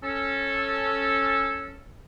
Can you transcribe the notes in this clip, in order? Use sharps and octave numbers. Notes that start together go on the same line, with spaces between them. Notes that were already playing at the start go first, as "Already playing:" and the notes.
C#4 A4